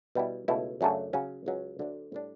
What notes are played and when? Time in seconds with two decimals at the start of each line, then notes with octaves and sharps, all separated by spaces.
0.15 B2 G3 B3 E4
0.48 C#2 B2 A3 E4
0.81 F#2 C#3 F#3 A3 D4
1.13 C#3 F#3 C#4
1.46 C#2 C#3 F#3 C#4
1.79 D2 D3 F#3 A3 D4
2.12 A2 G3 D4